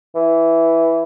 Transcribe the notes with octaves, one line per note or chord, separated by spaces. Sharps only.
E3